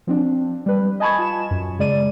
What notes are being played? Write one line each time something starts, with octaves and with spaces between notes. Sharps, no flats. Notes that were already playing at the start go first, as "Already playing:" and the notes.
F3 C4 D4
G3 B4
D#5 G#5 A5 B5 C#6 G#6
F4 E7
F#2
C#3 G#3 D5 D#7